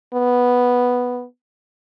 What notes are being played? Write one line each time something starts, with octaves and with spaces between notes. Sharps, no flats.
B3